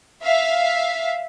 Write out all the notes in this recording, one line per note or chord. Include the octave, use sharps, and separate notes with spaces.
E5 F5